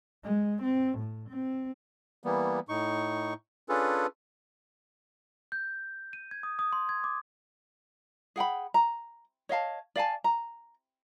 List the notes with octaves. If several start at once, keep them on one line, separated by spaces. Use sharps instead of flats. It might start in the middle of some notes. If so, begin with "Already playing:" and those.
G#3
C4
A2
C4
E3 G3 A#3 B3
A2 D#4 C#6
C#4 D4 F4 G#4 A4 B4
G6
D#7
G#6
D#6
D#6
C6
G#6
D6
G#4 F#5 G5 B5
A#5
C#5 D#5 F5 A5
D5 F5 G#5 A5
A#5